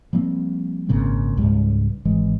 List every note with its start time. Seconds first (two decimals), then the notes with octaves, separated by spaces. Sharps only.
0.13 F3 G3 A#3 C4
0.89 G#1 A#2 C#3 C4
1.37 C#2 G#2 G3 G#3
2.05 G#1 E3 G#3